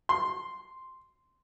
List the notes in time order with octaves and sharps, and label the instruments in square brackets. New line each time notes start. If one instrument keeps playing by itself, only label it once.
[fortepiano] C6